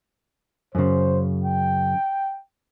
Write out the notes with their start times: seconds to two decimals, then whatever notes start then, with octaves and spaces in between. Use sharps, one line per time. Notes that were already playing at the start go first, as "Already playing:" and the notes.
0.75 F#2 C#3 C5
1.45 G5